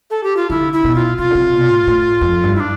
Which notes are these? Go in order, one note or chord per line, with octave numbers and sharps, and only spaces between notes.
A4
G4
F4
D3 E4
E4
B2
F4
C3 F4
D3
C3
B2
A2
A2
F2
G2
E4
D4